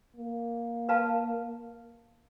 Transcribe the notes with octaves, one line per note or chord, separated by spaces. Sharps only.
A#3
B4 F5 A5